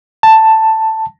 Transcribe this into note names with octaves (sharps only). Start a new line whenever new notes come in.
A5